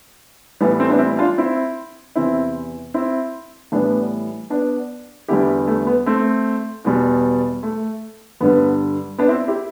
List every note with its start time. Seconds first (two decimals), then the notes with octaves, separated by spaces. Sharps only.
0.61 A2 E3 G3 B3
0.79 A3 C4
0.90 B3 D4
0.99 C4 E4
1.18 D4 F4
1.38 C4 E4
2.16 E2 C3 E3 C4 E4
2.94 C4 E4
3.72 A2 E3 G3 B3 D4
4.50 B3 D4
5.28 E2 D3 G3 E4 G4
5.67 A3
5.87 B3
6.06 A3 C4
6.85 E2 B2 G3
7.63 A3
8.40 G2 D3 G3 B3
9.18 B3 D4
9.28 C4 E4
9.48 E4 G4